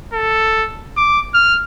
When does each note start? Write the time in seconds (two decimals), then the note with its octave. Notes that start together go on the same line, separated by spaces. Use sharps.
0.13 A4
0.97 D6
1.34 F6